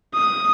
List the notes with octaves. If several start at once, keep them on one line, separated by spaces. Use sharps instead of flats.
D#6